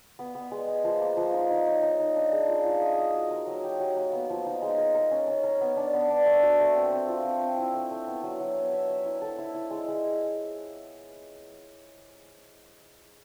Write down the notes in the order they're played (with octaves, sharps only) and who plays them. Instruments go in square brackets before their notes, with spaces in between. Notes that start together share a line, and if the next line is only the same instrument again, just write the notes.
[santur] B3
B3
G#3
G#3
F3
A#3
F3
D#4
D#4
C#5
D#4
D#4
D4
G#4
F4
F4
D#5
D#5
F#4
A#4
F#3
G4
F#3
A#3
B3
F3
D#4
G#3
A#4
A#4
C#4
C#4
A#4
B3
D4
B3
D4
A3
F#4
A3
C4
C4
F4
C4
C4
E4
A3
A3
B3
F#3
F#3
B3
E5
E5
E4
A4
E4
E4
G#3
G#3